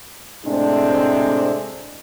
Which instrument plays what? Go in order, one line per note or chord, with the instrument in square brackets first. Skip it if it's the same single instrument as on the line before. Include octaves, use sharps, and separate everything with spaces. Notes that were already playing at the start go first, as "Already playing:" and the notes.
[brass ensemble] A2 C3 G#3 A3 C4 D4